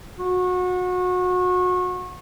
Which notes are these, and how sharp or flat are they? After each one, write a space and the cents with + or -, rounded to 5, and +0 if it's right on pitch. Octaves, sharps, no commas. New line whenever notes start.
F#4 -30